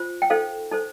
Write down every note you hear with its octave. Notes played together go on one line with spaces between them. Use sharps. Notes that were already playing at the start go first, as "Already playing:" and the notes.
Already playing: F4 C5
G5
D#4 A4 C5 F5
D#4 A4 C5